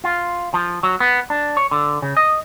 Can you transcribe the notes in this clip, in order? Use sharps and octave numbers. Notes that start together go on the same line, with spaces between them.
F4
F3
F#3
B3
D4
C#5
D3
C#3
D#5